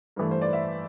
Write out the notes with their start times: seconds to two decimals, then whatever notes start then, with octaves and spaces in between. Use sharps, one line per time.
0.16 G2 E3 A3
0.31 C5
0.42 D5
0.53 E5